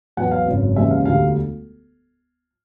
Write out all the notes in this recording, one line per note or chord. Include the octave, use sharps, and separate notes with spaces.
E2 B2 F#3 B3 F#5
F5
G#1 F#2 C#3
D#2 C#3 E3 G#3 E5
F5
E1 D2 D3 G3 F5